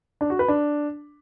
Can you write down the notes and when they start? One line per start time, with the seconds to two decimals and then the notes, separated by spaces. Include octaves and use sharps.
0.21 D4
0.30 F#4
0.39 B4
0.48 D4